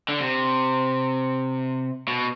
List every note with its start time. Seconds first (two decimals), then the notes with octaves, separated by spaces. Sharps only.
0.08 D3
0.20 C3
2.08 B2